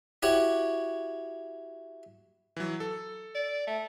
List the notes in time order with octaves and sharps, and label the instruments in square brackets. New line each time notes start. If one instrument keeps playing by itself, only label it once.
[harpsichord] E4 F#4 G4 C#5
[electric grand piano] E3 F#3
A4
[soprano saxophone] D5
A3